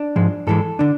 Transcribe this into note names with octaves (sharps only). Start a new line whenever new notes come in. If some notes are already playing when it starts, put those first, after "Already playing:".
Already playing: D4
G#2 F3 G#3
G#2 E3 G#3 A4
D3 D4